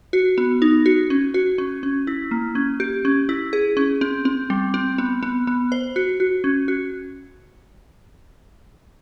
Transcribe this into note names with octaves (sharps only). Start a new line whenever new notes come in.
F#4
B3
D#4
F#4
C#4
F#4
C#4
C#4
E4
A#3
C#4
G4
C#4
E4
G#4
C#4
C4
C4
G3
C4
B3
B3
B3
C5
F#4
F#4
C#4
F#4